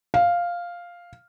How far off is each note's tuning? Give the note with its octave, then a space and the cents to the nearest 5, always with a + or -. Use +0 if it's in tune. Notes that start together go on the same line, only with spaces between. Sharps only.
F5 +0